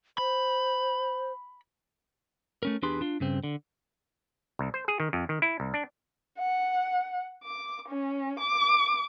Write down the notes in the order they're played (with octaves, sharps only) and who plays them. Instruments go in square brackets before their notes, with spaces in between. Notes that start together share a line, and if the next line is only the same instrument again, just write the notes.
[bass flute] C5 [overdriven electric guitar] B5
[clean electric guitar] A3 C#4 A#4
E2 D4 G4 G#4 B4 C6
D4 F4
G2 C#3 C4
D3
[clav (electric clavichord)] C2
C5
G#4
D#3
F2
D#3
E4
C2
D4
[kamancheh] F#5
D6
C#4
D6